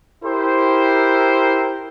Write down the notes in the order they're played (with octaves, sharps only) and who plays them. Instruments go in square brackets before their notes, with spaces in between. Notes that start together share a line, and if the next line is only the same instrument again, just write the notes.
[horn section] E4 G4 A#4 C5